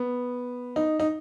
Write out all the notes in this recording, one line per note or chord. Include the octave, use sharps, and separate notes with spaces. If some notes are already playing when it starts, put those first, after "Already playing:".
Already playing: B3
D#4
D#4